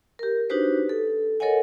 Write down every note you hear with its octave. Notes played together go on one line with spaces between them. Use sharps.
G4 A#4
D4 D#4 F#4 G4 B4 C5
A4
A4 A#4 C#5 D#5 F#5 G#5